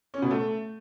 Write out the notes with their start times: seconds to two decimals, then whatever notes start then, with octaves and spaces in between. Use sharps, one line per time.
0.14 C#4
0.22 B2
0.31 A3